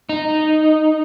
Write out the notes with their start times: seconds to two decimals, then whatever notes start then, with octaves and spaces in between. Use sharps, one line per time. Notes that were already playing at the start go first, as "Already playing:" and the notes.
0.09 D#4